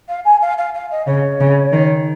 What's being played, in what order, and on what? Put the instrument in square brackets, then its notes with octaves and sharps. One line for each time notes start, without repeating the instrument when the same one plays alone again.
[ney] F5
G#5
F5
F5
F5
D#5
[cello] C#3 [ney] C#5
[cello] C#3
D#3